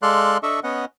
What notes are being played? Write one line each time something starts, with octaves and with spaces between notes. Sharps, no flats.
G#3 A4 D5 F5 C6 F#6
D4 A4 D#5 E5 C#6
B3 C#4 D#5 F#5